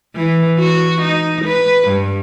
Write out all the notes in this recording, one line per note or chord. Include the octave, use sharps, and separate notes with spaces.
E3
F#4
D#4
B4
G2